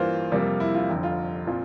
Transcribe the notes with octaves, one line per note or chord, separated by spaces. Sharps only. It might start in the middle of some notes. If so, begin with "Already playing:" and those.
Already playing: G2 E3 A#3 F4 C5
F2 C3 G3 A#3
E4
F4
F1 F2 D3
F4
A#2 F3 C4